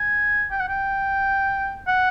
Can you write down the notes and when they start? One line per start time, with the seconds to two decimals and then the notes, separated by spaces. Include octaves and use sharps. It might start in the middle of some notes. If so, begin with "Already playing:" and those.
Already playing: G#5
0.51 G5
0.60 F#5
0.69 G5
1.88 F#5